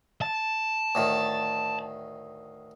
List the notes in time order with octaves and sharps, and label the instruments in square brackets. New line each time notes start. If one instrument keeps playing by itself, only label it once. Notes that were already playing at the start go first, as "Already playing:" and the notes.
[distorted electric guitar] A5
[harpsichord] D2 A2 D#3